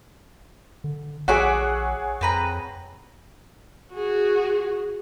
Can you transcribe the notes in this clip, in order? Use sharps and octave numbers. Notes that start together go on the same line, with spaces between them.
D3
A#1 F#4 G#4 C#5 E5 F#5 D6
F2 C4 B4 A#5
F#4 G#4